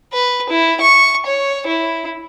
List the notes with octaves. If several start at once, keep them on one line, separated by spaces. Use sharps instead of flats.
B4
E4
C#6
C#5
E4